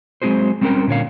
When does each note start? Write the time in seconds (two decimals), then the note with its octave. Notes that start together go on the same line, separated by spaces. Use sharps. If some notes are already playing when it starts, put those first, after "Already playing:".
0.22 F#3 G#3 C4 F#4 G#4 C5
0.61 G3 C4 C#4 D#4 A#4 G5
0.87 A#2 D3 C#5 F5